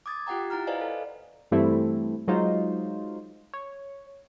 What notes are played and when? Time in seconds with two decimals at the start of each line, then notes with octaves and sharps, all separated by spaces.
0.06 D6 D#6 G#6 A6
0.27 F4 G4 F#5 G5 A#5
0.50 E4 F#5 A#5 F6
0.67 B4 C5 D5 D#5 F5 G#5
0.81 A4
1.51 G2 E3 G3 A3 C4 E4
2.28 F#3 G#3 D#4 F4 C5
3.53 C#5